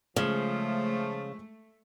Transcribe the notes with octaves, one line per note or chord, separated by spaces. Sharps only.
C#3 F3 G#3 A3 C#4 E7